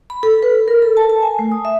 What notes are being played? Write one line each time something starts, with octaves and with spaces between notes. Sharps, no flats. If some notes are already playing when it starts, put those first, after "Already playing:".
B5
A4
B4
A#4
A4
A5
A5
G#5
A3
D#6
E5